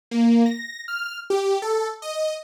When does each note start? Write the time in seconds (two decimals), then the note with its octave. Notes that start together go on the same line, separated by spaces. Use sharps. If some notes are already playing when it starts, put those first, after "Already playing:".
0.11 A#3
0.46 A#6
0.88 F6
1.30 G4
1.62 A4
2.02 D#5